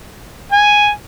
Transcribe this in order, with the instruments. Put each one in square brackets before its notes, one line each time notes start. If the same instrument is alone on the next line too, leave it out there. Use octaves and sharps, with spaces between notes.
[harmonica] G#5